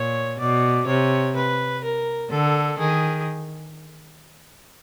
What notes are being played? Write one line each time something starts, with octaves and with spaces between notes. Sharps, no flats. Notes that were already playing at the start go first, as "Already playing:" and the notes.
Already playing: A#2 C#5
B2 D5
C3 C#5
B4
A#4
D3 A4
D#3 G#4